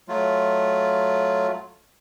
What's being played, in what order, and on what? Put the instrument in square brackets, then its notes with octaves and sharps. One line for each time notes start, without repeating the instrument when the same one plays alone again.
[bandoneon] F#3 A3 F4